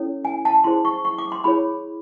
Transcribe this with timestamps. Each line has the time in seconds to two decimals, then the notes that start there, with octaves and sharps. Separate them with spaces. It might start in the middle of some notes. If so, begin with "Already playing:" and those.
Already playing: C#4 E4 A4 C#5
0.25 G#5
0.45 A5
0.64 E4 G#4 C5 C6
0.85 C#6
1.05 C#6
1.19 D6
1.32 C6
1.44 E4 G#4 C#5 B5